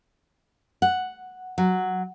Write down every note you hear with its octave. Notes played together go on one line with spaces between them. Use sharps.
F#5
F#3